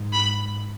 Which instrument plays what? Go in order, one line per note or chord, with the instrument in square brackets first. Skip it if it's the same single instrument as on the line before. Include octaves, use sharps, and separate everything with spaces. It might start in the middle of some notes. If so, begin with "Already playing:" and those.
Already playing: [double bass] G#2
[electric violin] B5